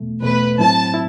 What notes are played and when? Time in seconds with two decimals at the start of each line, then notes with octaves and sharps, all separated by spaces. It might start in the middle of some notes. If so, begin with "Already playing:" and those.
Already playing: E2 B2 A3
0.21 E2 B2 A3 B4
0.58 A2 F#3 C4 E4 A5
0.94 E4